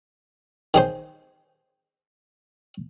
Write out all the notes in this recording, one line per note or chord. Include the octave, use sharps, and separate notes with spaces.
D#3 G#4 C5